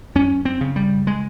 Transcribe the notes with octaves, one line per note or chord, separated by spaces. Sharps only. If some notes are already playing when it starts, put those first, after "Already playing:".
F#2 C#4
C4
C#3
G3
G#3